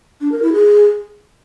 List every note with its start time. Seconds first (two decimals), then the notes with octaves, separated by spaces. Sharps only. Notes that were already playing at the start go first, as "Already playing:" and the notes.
0.21 D4
0.32 A#4
0.42 E4
0.53 G#4